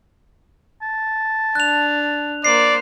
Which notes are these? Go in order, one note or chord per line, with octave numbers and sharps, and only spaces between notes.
A5
D4 F#6 F7
A#3 C5 D5 C7